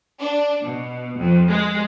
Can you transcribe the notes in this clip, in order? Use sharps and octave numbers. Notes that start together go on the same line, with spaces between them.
D4
B2
F2
G#3